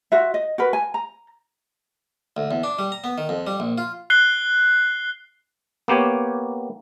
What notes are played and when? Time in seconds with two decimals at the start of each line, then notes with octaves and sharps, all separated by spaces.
0.12 F4 F#4 E5
0.34 D#5
0.58 F#4 A#4 B4
0.73 G#5
0.94 A#5
2.37 D2
2.51 E2
2.64 D4
2.79 G3
2.92 A#5
3.04 B3
3.18 D#3
3.29 F2
3.47 G3
3.60 A#1
3.78 F4
4.10 F#6 C7 G7
5.88 A#3 B3 G4 C#5